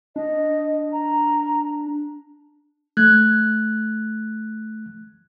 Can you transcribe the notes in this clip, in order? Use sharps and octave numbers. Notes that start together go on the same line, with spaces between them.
D4 D#5
A#5
A3 F#6 G#6